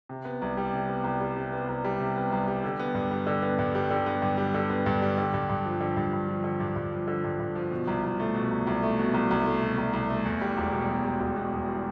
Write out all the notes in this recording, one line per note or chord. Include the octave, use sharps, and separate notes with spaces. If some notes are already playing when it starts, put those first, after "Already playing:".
C3
B3
C2
G3
C3
B3
C2
G3
C3
B3
C2
G3
C3
B3
C2
G3
D3
B3
G2
G3
D3
B3
G2
G3
D3
B3
G2
G3
D3
B3
G2
G3
D3
G2
G2
F3
D3
G2
G2
F3
D3
G2
G2
F3
D3
G2
G2
F3
B2
C2
C2
A3
B2
C2
C2
A3
B2
C2
C2
A3
B2
C2
C2
A3
E2
G3
E1
B2
E2
G3
E1
B2
E2
G3